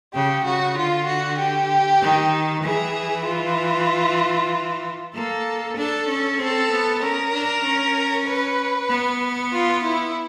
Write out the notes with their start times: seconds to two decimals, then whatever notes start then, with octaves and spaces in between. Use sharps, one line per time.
0.14 C#3 G4
0.44 C#3 F#4
0.76 D3 F4
1.07 F#4
1.39 G4
2.01 D#3
2.64 E3 G#4
3.26 F4
5.14 A#3 A4
5.77 D4 A4
6.09 C#4
6.39 C4 A4
6.71 B3
7.02 C#4 A#4
7.34 D4
7.64 C#4
8.26 B4
8.89 B3
9.52 F4
9.83 E4